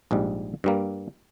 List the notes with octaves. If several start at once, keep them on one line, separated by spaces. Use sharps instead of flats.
A#1 G#2 G3
G2 G3 A#3